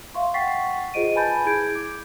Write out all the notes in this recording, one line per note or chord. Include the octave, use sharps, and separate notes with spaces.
E5 F5 C6 C#6
F#5 G5 C#6 A6 B6 C7
F4 G#4 C5 D#5 D7 D#7
B4 G#5 A5 B5 G6 A6
E4 G#4 G6 G#6 D7
D6